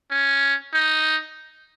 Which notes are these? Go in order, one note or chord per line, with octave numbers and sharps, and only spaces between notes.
C#4
D#4